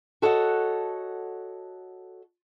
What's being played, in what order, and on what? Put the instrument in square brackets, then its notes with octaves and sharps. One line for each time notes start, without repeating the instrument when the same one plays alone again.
[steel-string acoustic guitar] F#4 A4 C#5 D#5 F5 F#5